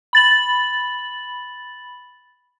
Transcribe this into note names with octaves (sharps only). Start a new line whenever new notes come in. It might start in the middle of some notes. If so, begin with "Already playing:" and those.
B5 A6 F#7